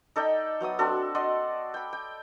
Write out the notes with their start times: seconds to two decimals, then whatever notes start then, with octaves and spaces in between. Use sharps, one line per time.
0.16 D#4 A4 D5 G5
0.61 F#3 B3 E5 D#6
0.79 C4 D4 F#4 A4
1.15 D5 D#5 F#5 C6
1.74 G5 B5
1.93 G5